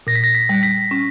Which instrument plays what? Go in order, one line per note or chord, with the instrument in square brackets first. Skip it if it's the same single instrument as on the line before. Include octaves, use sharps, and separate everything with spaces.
[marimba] A#2 [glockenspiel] A#6
[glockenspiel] B6
A#6
B6
[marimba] G3
[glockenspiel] B6
[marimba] C#4